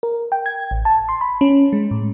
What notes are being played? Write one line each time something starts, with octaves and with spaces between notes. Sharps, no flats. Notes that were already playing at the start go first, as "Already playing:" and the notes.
A#4
G5
G#6
A1
A5
C6
B5
C#4
G#3
A2